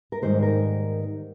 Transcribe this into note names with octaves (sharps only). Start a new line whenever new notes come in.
A#4
G#2 D#3 G3 A#3 C5
A#4